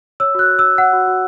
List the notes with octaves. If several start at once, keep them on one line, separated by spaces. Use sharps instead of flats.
C#5 E6
F#4 F#6
F#4
E6
C#5
C#5 F#5
F#4
F#4